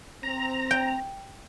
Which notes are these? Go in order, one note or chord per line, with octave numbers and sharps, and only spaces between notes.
C4 A#5
G5